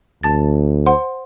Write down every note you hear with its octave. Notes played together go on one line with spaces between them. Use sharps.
D2 A5 A6
C5 F#5 C6